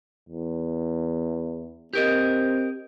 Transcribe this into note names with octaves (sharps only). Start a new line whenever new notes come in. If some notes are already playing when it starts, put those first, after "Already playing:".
E2
C4 G4 A#4 D#5